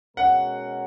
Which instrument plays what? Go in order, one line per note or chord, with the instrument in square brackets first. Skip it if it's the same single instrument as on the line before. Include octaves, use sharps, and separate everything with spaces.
[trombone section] B2 G#3 C#4 F#4 A#4 [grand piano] F#5